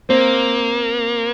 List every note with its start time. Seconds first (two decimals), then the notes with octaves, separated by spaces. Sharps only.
0.09 A#3 C4